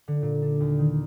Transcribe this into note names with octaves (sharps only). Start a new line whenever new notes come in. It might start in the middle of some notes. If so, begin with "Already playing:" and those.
D3
A#2
D4
D#2
D#3